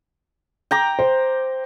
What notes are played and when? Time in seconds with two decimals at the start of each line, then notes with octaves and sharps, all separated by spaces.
0.71 G5 A#5 D6
0.99 C5